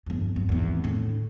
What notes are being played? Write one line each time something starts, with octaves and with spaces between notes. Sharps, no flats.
G1 F2
F#2
G#1 E2
A2 D3